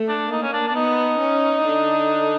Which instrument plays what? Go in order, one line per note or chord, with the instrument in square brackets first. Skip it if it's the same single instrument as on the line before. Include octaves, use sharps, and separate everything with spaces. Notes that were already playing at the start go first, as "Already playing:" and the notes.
Already playing: [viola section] A3
[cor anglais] D4
[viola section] A#3 [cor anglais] D#4
[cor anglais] C#4
D4
D4
[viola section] B3 [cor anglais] D#4
[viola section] C#4
D3 D4